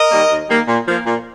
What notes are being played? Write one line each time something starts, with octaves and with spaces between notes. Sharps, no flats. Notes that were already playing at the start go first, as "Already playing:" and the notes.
Already playing: A#4 D#5
D#3 G3 A#3
D#2
D#3 G3 A#3
A#2
F3 A#3
A#2